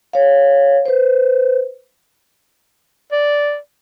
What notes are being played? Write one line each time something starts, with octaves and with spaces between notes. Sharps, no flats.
C#5 F5
B4 C5
D5